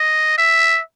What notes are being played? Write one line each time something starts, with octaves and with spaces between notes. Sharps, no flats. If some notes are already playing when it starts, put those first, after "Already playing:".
Already playing: D#5
E5